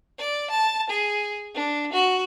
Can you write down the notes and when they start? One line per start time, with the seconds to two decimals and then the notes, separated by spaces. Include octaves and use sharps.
0.19 D5
0.50 A5
0.90 G#4
1.55 D4
1.93 F#4